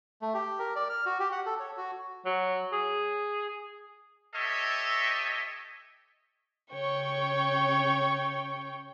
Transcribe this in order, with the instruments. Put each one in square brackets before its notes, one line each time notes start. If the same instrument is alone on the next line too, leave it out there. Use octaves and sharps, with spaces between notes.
[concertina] A3
G4
A#4
D5
F6
F#4
G4
F#5
A4
C#5
F#4
[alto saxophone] F#3
G#4
[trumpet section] G4 A4 C#5 D#5 E5
[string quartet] C#3 C#5 G5 C#6